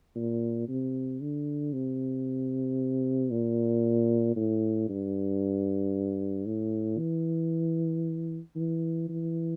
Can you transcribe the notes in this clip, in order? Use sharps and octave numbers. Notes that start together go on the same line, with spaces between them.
A#2
C3
D3
C3
A#2
A2
G2
A2
E3
E3
E3